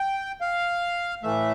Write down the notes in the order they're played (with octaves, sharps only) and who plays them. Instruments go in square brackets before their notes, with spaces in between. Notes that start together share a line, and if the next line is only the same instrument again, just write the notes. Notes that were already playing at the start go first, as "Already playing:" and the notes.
Already playing: [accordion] G5
F5
A2 E3 A3 E5